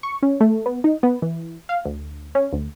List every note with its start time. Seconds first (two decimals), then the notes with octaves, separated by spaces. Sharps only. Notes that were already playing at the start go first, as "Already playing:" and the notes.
0.03 C#6
0.23 C#4
0.40 A3
0.66 B3
0.84 D#4
1.03 B3
1.22 E3
1.69 F5
1.85 D2
2.35 C#4
2.53 D2